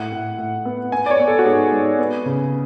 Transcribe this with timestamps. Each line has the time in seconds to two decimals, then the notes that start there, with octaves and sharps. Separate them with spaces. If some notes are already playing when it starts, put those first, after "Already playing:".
Already playing: A2 F#5
0.12 A2
0.39 A2
0.65 B3
0.92 B3 G#5
1.06 D5
1.11 C#5
1.20 B3
1.27 A4
1.39 F#4
1.45 G#2 G#4
1.72 G#2
1.99 B3
2.26 C#3